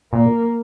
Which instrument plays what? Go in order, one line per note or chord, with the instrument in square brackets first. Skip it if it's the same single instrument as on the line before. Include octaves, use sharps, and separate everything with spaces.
[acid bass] A#2 [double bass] A#3